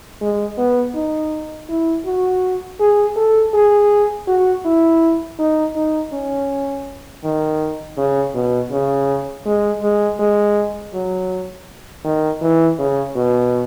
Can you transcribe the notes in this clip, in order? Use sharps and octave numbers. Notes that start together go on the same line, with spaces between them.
G#3
B3
D#4
E4
F#4
G#4
A4
G#4
F#4
E4
D#4
D#4
C#4
D#3
C#3
B2
C#3
G#3
G#3
G#3
F#3
D#3
E3
C#3
B2